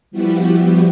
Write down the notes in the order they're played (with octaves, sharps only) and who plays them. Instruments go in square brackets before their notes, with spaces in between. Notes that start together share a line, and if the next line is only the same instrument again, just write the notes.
[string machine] F3 G3 B3 E4 F#4 G4